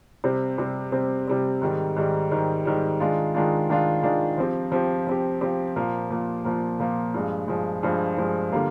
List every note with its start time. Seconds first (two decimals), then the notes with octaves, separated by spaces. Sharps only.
0.24 C3 G3 C4
0.58 C3 G3 C4
0.92 C3 G3 C4
1.27 C3 G3 C4
1.61 G#2 D#3 G3
1.96 G#2 D#3 G3
2.31 G#2 D#3 G3
2.65 G#2 D#3 G3
3.00 D#3 G#3 D4 F4
3.34 D#3 G#3 D4 F4
3.69 D#3 G#3 D4 F4
4.03 D#3 G#3 D4 F4
4.38 F3 C4 G4
4.72 F3 C4 G4
5.07 F3 C4 G4
5.41 F3 C4 G4
5.76 A#2 F3 A#3
6.10 A#2 F3 A#3
6.44 A#2 F3 A#3
6.79 A#2 F3 A#3
7.14 G2 F3 G#3
7.48 G2 F3 G#3
7.83 G2 F3 G#3
8.18 G2 F3 G#3
8.52 D3 G3 A#3 F4